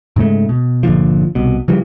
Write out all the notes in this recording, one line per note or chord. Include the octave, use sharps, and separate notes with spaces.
G#2 C#3 G#3 A3
B2
G1 A#2 D3 F3
C2 B2
C#3 E3 F3 G3